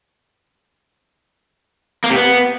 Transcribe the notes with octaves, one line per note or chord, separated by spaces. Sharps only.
A#3
C3
B3